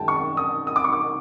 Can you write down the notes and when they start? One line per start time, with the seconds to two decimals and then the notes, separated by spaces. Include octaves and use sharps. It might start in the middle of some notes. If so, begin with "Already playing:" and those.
Already playing: F#2 D#3 G#3 C#4 G5 A5
0.08 C#6
0.37 D#6
0.67 D#6
0.76 D6
0.84 C#6
0.92 D6